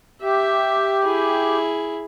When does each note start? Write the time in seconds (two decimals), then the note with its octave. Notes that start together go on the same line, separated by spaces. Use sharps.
0.22 G4 E5
1.04 E4 G#4